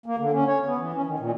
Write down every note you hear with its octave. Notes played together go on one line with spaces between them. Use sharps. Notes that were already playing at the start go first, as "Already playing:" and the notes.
A#3
D3
C#4
C#5
B3
E3
C#4
D#3
A#2